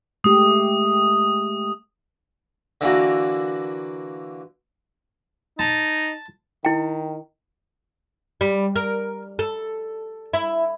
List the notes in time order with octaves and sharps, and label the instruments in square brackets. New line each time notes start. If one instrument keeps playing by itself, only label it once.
[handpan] G#3 A3 G4 [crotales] D#6
[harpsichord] D3 E3 A#3 F#4
[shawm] D#4 [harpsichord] A5
[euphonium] D#3 [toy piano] E4 G5
[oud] G3
A#4
A4
E4